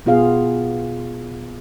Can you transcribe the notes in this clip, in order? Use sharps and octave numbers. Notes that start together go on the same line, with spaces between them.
B2 B3 F4 G#4 F5